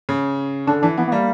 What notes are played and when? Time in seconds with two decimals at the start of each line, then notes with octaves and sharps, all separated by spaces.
0.09 C#3
0.67 D3 D4
0.82 E3 D4
0.97 E3 B3
1.08 B3
1.12 G3 A#3